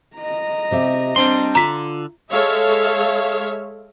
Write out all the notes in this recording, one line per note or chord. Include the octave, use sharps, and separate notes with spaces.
D#5 A#5
C3 G4 E5
G3 C4 D4 C6
D3 F4 A#5 B6
G#3 A4 C#5 E5 F5